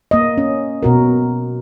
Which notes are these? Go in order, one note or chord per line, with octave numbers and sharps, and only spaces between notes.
A#3 D#5
C#4
B2 F#4 A#4